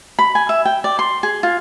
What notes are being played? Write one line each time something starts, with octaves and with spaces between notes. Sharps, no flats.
B5
G#5
E5
G5
D5
C6
G#4
F4